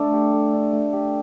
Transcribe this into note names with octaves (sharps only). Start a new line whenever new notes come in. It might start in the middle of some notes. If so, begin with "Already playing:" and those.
Already playing: A3 D4
G4
A3
D4
A3
G4